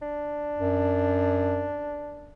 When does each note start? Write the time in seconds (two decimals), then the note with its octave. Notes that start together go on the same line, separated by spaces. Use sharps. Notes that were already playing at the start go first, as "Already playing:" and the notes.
0.02 D4
0.58 F#2